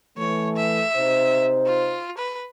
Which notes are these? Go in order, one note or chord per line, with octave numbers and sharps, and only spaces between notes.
E3 A3 C#5
E5
C3 D#4 C5
F4
B4